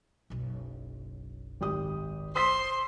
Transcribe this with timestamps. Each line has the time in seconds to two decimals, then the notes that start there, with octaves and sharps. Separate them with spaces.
0.30 F#1 B1
1.61 G#1 G4 D#6
2.36 C5 C6 D#6 E6 B6